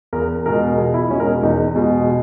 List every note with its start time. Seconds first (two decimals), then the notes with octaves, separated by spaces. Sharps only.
0.13 E2 A#4
0.46 B2 G#3 A#4
0.78 E2 G#4
0.94 E4
1.10 B2 G#3 C#4
1.20 A#4
1.27 G#4
1.43 E2 D#4
1.76 B2 G#3